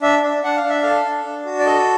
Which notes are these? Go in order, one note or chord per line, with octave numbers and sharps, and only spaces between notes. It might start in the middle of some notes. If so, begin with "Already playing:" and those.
D4 E5
D4
D4 F#5
F5
D4
E5
A4 F5
D4
D4
F#4
D5
A4 D#5